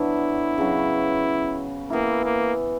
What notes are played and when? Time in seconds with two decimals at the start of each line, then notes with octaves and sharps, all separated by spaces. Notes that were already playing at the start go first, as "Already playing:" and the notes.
Already playing: D3 F#3 B3 D4 E4
0.58 C#3 F#3 B3
1.90 E3 A#3 B3 E4
2.24 A#3